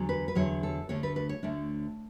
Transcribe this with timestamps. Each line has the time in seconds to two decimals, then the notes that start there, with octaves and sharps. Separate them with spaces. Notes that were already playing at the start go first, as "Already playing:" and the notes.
Already playing: E2 D3 F#3
0.09 B4
0.28 B4
0.35 E2 D3 F#3 C#5
0.63 A4
0.89 D2 D3 A3 D4 C#5
1.03 B4
1.16 B4
1.29 C#5
1.43 D2 D3 A3 D4